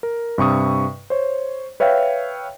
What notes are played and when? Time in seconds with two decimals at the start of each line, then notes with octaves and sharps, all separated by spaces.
0.03 A#4
0.38 G2 C3 C#6 D#6
1.10 C5 C#5
1.80 B4 C#5 E5 F5 G5